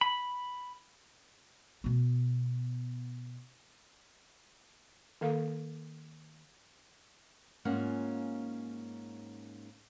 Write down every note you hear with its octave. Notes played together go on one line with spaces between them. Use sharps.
B5
B2 B3
D#3 A#3 A4 F5
G#2 A#3 C#4 F4 F#5